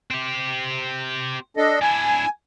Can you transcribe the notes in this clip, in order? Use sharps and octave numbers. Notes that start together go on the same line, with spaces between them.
C4 G4
D4 A4 D#5
D4 E4 G#5